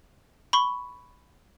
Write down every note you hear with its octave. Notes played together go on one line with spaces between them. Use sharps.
B5 C#6 G7